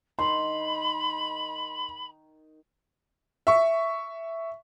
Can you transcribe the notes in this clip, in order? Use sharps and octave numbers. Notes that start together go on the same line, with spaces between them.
D#3 B5 C6
E5 C#6